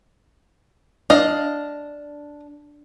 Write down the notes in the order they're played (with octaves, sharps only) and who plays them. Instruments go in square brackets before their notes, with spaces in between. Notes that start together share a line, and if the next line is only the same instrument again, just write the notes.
[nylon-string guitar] D4 [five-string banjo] D#5 F5